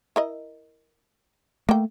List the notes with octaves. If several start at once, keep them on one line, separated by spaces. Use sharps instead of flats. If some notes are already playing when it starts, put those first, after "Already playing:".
E4 A#4 D#5
A3 A#3 G5